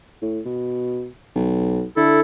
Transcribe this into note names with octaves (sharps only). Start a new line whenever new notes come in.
A2
B2
B1
D3 E4 A4